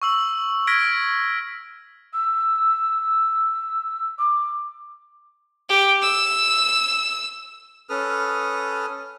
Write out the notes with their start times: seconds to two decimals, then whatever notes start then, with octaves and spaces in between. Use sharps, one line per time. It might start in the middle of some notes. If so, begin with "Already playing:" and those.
0.02 C#6 E6 F#7
0.67 F6 G#6 A#6 B6 D7
2.13 E6
4.18 D6
5.69 G4
6.02 E6
7.89 C#4 A4 B4 D#6 F6